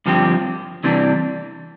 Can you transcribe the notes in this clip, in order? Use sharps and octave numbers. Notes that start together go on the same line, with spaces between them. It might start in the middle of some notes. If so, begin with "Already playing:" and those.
G2 D3 F3 C4 G4
C3 E3 G3 D4